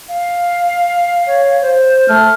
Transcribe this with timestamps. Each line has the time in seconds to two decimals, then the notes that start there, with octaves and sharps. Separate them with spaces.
0.09 F5
1.27 C#5
1.62 C5
2.08 A3 F6